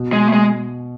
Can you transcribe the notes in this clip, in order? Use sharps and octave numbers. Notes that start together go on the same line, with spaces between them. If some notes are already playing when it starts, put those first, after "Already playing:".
Already playing: B2
G#3
A3
G#3